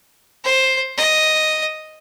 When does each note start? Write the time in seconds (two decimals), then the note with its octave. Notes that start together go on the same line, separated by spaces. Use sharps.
0.45 C5
0.98 D#5